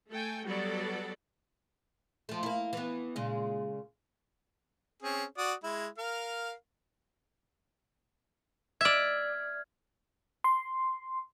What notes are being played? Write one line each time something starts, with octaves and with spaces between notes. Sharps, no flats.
A3 A4 G5 G#5
F#3 G3 B3 F#4 A4 D5
F3 A3
A#3 E4
E3 B3
A#2 C#3 G#3
C4 C#4 G#4
F#4 D5 D#6
G#3 E4
A#4 F5
D5 E5 F6 G#6
C6